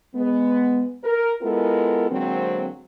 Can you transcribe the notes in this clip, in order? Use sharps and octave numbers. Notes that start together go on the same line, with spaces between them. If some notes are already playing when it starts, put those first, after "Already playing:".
G#3 B3
A#4
G#3 B3 E4 F4 A4 A#4
D3 F#3 G#3 A#3 C4